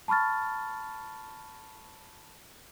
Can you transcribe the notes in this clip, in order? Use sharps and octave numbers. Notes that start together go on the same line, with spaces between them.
A5 B5 C#6 F6 A6